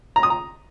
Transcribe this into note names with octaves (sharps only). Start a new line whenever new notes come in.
A#5
D#6
A#5